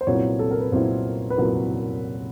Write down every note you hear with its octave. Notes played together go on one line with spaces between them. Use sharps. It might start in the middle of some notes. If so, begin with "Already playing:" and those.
C5
C2 A#2 F#3 B3 E4 C#5
A4
A#4
B4
C2 A#2 F#3 B3 E4 C5
B4
C2 A#2 F#3 B3 E4 A#4